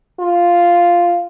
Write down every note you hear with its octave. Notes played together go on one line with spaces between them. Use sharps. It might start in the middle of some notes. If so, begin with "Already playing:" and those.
F4